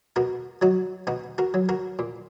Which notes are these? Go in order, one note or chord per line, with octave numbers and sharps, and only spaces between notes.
B2 F#4 A#4
F#3 D#4 F#4
B2 D#4 F#4
F#4 A#4
F#3
F#4 A#4
A#2